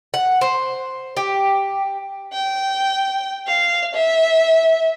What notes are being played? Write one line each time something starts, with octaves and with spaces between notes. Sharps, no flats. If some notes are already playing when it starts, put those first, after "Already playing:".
F#5
C5
G4
G5
F5
E5